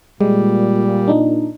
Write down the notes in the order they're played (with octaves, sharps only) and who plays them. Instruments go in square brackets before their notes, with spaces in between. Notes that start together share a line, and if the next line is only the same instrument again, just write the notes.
[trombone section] A#2 [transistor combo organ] G3 [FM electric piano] G#3
[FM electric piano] D4 D#4